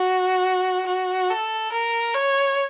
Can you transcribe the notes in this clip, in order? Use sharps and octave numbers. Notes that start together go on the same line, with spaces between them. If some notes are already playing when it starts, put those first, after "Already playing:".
Already playing: F#4
F#4
A4
A#4
C#5